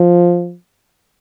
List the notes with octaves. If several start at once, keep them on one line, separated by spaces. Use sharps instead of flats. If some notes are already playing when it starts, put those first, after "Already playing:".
Already playing: F3